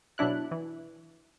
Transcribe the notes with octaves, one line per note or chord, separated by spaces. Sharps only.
B2 F#3 D4 E4 F#6
E3